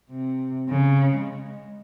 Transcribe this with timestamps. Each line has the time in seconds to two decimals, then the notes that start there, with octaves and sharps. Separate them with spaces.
0.10 C3
0.69 C#3
1.16 G#3